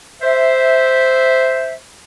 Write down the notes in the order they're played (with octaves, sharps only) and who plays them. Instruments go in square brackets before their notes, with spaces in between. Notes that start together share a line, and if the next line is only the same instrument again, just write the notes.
[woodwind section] C5 E5